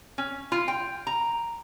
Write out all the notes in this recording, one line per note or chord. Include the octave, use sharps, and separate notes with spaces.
C#4
F4
G5
A#5